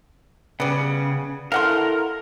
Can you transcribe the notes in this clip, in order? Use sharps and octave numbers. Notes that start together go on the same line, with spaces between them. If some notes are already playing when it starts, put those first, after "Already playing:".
C#3 G3 B3
E4 A4 A#4 F5 F#5 C6